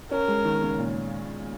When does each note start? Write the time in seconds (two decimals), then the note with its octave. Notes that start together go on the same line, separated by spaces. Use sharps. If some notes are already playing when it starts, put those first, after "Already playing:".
0.11 C#4 A#4
0.28 G#3
0.45 D#3
0.63 C#3
0.78 A#2